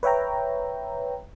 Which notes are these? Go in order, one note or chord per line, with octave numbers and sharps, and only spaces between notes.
B4 C#5 E5 G5 A#5